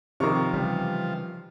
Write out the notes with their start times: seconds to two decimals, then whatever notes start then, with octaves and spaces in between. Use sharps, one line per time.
0.20 C3 D#3 F3 A#5 C#6
0.53 C#3 E3 G3